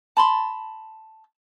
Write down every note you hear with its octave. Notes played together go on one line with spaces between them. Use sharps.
A5 B5 C6